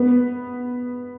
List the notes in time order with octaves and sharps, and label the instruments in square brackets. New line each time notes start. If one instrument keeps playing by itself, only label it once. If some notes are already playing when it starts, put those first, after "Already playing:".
Already playing: [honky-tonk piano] B3